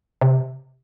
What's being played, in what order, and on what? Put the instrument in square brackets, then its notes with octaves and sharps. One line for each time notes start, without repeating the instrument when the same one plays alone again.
[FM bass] C3